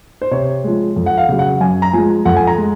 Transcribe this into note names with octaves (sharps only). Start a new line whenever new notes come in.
C5
C3 C#5
F3 G#3
F2
F#5
F5
C#3 F#3
F#5
F#2 G#5
A#5
F3 G#3 G#5
F2 F#5
G#5
A#5
G#3